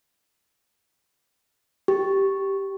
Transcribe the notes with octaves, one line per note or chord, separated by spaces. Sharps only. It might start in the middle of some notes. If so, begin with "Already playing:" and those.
G4